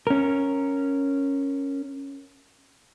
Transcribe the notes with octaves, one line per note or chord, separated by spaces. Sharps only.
C#4 A#4